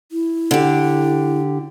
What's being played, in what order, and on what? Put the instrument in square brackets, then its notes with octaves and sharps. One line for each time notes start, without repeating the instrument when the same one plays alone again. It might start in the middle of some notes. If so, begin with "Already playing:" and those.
[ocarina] E4
[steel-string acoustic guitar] D3 G4